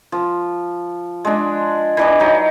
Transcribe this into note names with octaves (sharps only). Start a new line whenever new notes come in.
F3
G#3 D4
E3 D4 D#5
F#3 D#4